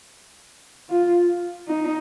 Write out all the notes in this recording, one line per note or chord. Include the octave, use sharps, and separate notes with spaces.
F4
D#4